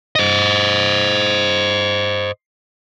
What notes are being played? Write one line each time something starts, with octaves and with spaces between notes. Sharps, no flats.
C5 D#5